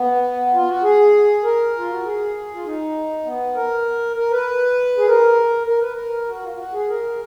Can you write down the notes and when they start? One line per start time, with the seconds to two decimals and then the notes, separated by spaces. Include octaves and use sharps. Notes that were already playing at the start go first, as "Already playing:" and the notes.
Already playing: B3
0.53 F4
0.67 F#4
0.83 G#4
1.43 A#4
1.78 F4
1.91 F#4
2.04 G#4
2.54 F4
2.65 D#4
3.25 B3
3.55 A#4
4.16 A#4
4.31 B4
4.97 G#4
5.07 A#4
5.67 A#4
5.81 B4
5.93 A#4
6.28 F#4
6.42 F4
6.54 F4
6.58 F#4
6.73 G#4
6.88 A#4